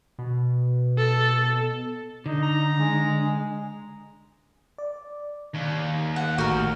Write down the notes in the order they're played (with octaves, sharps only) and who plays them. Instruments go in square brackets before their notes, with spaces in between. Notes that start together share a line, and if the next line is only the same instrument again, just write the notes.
[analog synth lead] B2
[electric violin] A4
[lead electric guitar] D3 [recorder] D#4
[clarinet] A#5
[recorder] G#3
[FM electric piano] D5
[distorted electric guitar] D#2
[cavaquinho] F#5
[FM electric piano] A1 A3 G6 [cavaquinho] F#4 A#4